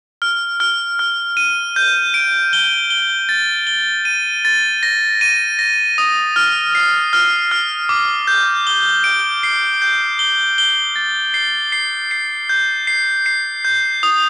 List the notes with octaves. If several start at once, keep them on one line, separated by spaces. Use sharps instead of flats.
F6
F6
F6
D#7
G6
D7
G7
G7
A6
G7
D#7
A6
A#6
D#7
A#6
D#6
F6
C7
F6
F6
D6
G6
G7
D7
C7
G6
G7
G7
A6
C7
C7
C7
G6
C7
C7
G6
D#6